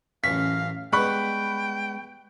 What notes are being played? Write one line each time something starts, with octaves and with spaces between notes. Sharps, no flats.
A1 F#2 F5 C#6 B6
G3 G#3 B3 G5 B5 C#6 F#6